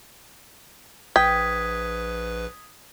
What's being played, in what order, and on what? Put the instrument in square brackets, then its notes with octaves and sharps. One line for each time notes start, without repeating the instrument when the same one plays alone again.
[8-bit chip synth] A#1 B4 [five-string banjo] G5 [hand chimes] D#6 G#6 B6